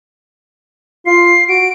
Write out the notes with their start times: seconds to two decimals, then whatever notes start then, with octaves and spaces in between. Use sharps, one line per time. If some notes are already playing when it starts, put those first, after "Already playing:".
1.06 F4 C7
1.49 F#4 D7